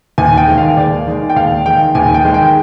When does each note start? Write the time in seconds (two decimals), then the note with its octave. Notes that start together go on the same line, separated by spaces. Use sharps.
0.18 D#2 G#5
0.37 G5
0.47 D#3 G#3
0.58 F5
0.77 D#2 D5
1.07 D#3 G#3
1.30 G5
1.36 D#2 F5
1.66 D#3 G#3 G5
1.95 D#2 G#5
2.14 G5
2.25 D#3 G#3
2.34 G5